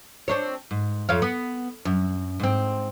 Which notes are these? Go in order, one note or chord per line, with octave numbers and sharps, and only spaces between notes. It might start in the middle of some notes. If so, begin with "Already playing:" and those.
C4 D4 C#5
G#2
F2 C#5 F5
B3
F#2
G#2 C4